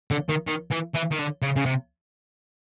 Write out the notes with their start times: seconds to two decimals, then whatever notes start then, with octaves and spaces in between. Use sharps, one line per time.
0.11 D3
0.29 D#3
0.47 D#3
0.71 E3
0.94 E3
1.11 D#3
1.18 D3
1.42 C#3
1.56 C#3
1.66 C3